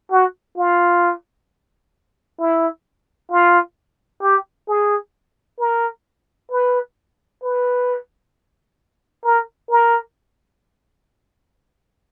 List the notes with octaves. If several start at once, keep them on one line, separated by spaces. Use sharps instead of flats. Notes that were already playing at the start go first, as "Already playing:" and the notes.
F#4
F4
E4
F4
G4
G#4
A#4
B4
B4
A#4
A#4